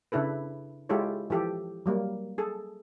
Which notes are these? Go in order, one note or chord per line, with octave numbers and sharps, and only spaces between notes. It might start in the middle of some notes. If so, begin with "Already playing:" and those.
C#3 D4 E4 A4 B4
G#3 E4 F4 G4 A4 C#5
E3 F3 G4 A4
F#3 G3 A#3
G#4 A4